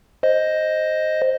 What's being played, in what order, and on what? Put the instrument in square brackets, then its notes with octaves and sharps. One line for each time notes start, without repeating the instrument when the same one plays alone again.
[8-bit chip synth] C5 D#5